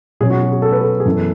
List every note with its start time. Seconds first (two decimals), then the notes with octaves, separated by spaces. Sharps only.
0.20 B2 F#3 C#4 G#4
0.30 F#4
0.42 F#4
0.52 G#4
0.62 A4
0.72 B4
0.81 A4
1.00 G#4
1.05 F#2 E3 B3 A4